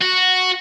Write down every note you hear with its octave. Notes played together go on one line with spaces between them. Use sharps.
F#4